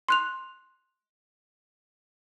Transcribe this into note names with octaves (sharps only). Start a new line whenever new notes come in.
C6 F#6 F7